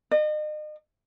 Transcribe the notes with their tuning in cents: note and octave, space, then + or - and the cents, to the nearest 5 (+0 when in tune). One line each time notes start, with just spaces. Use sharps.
D#5 -40